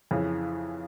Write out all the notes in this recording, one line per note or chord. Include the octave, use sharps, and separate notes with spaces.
F2 C#3 E3